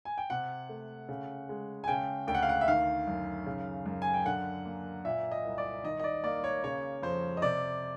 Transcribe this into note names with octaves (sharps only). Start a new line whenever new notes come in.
G#5
G5
C3 F#5
A3
C#3
G#3
G#5
C#3 G5
D2 G5
F#5
F5
F#5
E5
D#3 F5
F#2
C#3
F#2
G#5
G5
D3 F#5
A#3
A#2 E5
D#5
C2
D5
D#3 D#5
D#5
D5
A#3 D5
C#5
C#3 C#5
F2 C5
D#5
C3 D5